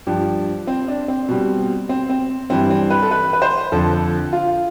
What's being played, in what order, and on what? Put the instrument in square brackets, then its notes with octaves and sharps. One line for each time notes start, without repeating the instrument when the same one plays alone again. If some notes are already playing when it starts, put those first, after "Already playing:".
[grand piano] G2 F3 G4
C4
D4
C4
B2 G3
C4
C4
G2 E3 G3 C4
C4
B4
A4
B4
B4
C5
F2 D3 F3 A4
F4